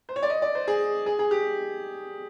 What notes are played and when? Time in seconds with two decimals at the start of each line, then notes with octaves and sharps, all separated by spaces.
0.09 C5
0.16 C#5
0.23 D5
0.30 D#5
0.42 D5
0.55 C5
0.68 G#4
1.06 G#4
1.19 G#4
1.31 G4